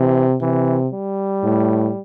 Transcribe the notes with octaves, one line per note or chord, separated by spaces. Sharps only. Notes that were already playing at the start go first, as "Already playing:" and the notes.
Already playing: C3 E3
C3 E3
G3
A2